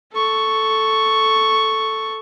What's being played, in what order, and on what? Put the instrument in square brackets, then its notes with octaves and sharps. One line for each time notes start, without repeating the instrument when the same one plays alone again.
[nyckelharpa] A4 C#6